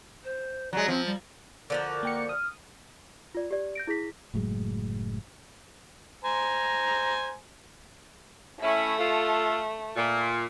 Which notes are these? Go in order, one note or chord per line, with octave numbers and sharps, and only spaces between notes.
C5
F#3 G#3 D5
F3 C4
G3
D3 F3 F#4 A#4 D6
A#3 G5 C#7
D#6 F6
F4 D5
G4 D5
G6 A#6 D7
E4 G#4 A#6 B6
F#1 A2 F#3 G#3
C5 G#5 A#5
A3 C#4 E4
F4 A4
A#2